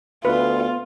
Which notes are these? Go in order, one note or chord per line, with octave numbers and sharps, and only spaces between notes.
D2 B3 F4 B4